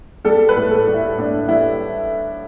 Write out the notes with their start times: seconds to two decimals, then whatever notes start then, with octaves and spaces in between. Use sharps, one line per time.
0.25 G3 A4
0.49 B4
0.56 A2
0.71 A4
0.87 G3
0.94 E4
1.17 A2 D4
1.48 G3 E4